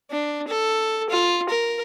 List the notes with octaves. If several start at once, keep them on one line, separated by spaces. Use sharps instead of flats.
D4
A4
F4
A#4